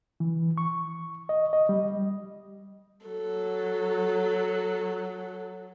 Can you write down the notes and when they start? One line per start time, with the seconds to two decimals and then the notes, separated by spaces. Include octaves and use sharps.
0.20 E3
0.58 C#6
1.29 D#5
1.53 D#5
1.69 G3
3.06 F#3 A4